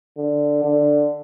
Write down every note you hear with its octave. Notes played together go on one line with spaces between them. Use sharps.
D3
D3